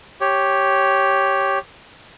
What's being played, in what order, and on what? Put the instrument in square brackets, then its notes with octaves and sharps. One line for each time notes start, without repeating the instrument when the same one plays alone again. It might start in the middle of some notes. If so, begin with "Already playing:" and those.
[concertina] G4 C#5